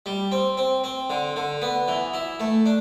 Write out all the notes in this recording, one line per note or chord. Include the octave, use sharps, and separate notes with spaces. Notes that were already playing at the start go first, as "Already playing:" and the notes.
G3
C4
C4
C4
D3
D3
B3
E3
E4
A3
D4